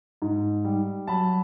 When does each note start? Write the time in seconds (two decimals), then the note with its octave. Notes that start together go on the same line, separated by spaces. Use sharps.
0.22 G#2
0.65 G3
1.08 F#3 A5 B5